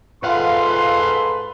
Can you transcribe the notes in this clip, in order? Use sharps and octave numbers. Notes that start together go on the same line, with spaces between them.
G#2 F4 A4 B4 F5 F#5 C6